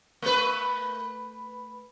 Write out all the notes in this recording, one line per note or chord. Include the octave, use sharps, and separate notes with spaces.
A3 B4